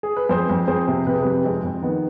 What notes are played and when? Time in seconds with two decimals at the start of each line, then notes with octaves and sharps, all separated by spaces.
0.03 G#4
0.17 B4
0.29 F2 G#4 C5
0.50 F2
0.67 F2 G#4 C5
0.88 C3
1.07 C3 B4
1.14 G#4
1.22 F2 G4 B4
1.44 F2 G#3 C4
1.63 F2
1.82 D#3 B3